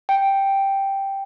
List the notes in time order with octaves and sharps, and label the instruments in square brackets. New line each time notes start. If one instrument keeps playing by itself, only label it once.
[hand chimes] G5